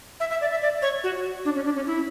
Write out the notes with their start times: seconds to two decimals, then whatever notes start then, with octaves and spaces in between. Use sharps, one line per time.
0.20 E5
0.30 E5
0.41 D5
0.51 E5
0.62 D5
0.82 C#5
1.04 F#4
1.45 D4
1.55 C#4
1.65 D4
1.76 C#4
1.87 E4